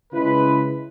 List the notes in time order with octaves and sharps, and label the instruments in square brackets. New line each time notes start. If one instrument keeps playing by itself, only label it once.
[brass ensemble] C#3 G#3 E4 B4